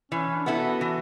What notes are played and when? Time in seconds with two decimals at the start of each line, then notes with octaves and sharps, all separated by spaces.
0.12 E3 C#4
0.35 D4
0.46 B3 E4 A4
0.57 F#4
0.81 E3